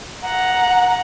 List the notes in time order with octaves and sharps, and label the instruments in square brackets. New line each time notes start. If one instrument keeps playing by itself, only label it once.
[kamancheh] F#5 A#5